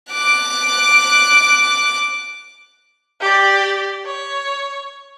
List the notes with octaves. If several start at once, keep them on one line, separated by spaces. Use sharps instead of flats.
D6 F#6
G4 D5
C#5